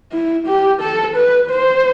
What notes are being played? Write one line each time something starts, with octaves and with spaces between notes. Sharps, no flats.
E4
G4
A4
B4
C5